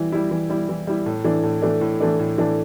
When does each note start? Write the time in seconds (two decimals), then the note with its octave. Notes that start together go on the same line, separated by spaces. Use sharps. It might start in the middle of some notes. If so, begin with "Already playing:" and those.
Already playing: E3 G3 E4
0.12 G3 E4
0.31 E3
0.49 G3 E4
0.69 E3
0.87 G3 E4
1.06 A2
1.24 E3 A3 D4
1.43 A2
1.62 E3 A3 D4
1.81 A2
2.00 E3 A3 D4
2.19 A2
2.38 E3 A3 D4